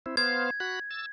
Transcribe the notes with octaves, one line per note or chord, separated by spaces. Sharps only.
C4 E4
B3 C5 F5 G#6
F#4 B5 F#6
E6 A6